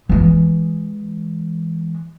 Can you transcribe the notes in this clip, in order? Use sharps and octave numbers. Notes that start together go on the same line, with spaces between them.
E3 G#3